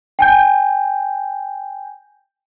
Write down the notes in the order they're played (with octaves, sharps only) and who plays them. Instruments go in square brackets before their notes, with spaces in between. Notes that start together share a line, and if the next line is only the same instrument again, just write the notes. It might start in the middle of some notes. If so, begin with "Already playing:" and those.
[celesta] G5 G#5 G6